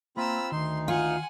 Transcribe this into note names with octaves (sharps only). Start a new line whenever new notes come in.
A#3 C4 F4 E5 A#5 B5 E6
D2 D#3 D#4 C6
F4 F#5 G#5